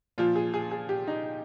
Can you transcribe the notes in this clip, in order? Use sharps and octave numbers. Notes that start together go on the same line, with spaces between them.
A#2 F3 F4
G#4
G#4
G#4
G4
D#4